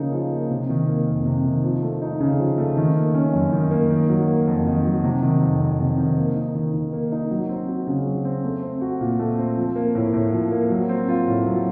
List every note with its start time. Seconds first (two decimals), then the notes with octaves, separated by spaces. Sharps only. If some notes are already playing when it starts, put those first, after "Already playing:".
Already playing: C#3 F3 A#3 D#4
0.12 F3
0.32 A#3
0.50 C3
0.69 D#3
0.88 A#3
1.07 F2
1.26 C3
1.45 D#3
1.64 F3
1.82 A3
2.02 D#4
2.20 C#3
2.39 F3
2.58 A3
2.77 D#3
2.96 A#3
3.14 C#4
3.33 F#2
3.52 D#3
3.71 A#3
3.90 D#3
4.09 F#3
4.28 A#3
4.47 F2
4.66 D#3
4.85 F#3
5.04 C3
5.22 D#3
5.41 F2
5.60 F2
5.80 C3
5.98 D#3
6.17 A#3
6.36 D#4
6.55 D#3
6.74 D#3
6.93 A#3
7.12 D#4
7.31 F#3
7.49 C4
7.68 F#4
7.87 C#3
8.06 F#3
8.25 C4
8.44 A3
8.62 C4
8.82 F#4
9.01 A#2
9.19 A3
9.38 C4
9.57 F3
9.76 A#3
9.95 A2
10.14 A2
10.33 F3
10.51 A#3
10.70 F#3
10.89 C4
11.09 F4
11.27 A2
11.46 F#3